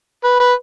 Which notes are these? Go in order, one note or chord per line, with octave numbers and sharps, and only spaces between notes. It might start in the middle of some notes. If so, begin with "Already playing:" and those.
B4
B4